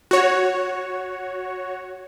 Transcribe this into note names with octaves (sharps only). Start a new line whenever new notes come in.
F#4 C#5